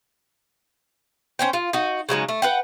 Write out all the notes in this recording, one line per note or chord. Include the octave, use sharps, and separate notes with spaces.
C#4 C5 G5
F4
D#4 F#4
C#3 F#3 G#3 D#4
A3
B4 F#5 G5